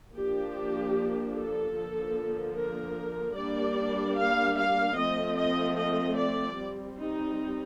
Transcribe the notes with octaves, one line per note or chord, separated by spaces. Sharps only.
F3 A#3 D4 G4
A4
D3 F3 A#3
A#4
G3 A#3 D4 D5
F5
F5
F3 A3 C4 D#5
D#5
D#5
D5
G3 C4
D#4